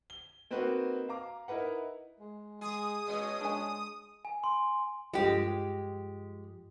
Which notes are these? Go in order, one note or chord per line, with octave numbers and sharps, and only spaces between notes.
G7
A#3 C4 D#4 F#4 B4
F5 A#5 D6
D#4 E4 A#4 B4 F#5
G#3
G#3 G#4 D#6
A#2 G#3 C#4
G#3 D4 G#5
G#5
C6
G2 F3 G#3 G4